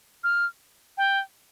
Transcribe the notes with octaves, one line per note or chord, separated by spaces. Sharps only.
F6
G5